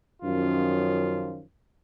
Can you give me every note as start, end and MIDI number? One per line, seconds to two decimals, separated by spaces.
0.23 1.41 42
0.23 1.41 51
0.23 1.41 53
0.23 1.41 61
0.23 1.41 65